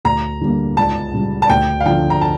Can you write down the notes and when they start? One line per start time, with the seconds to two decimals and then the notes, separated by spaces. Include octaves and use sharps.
0.05 D2 A#5
0.41 D3 G3 A#3
0.77 C#2 A5
1.14 C#3 G3
1.42 A5
1.49 D2 G5
1.80 F5
1.86 D3 F3 G5
2.10 A#5
2.21 A5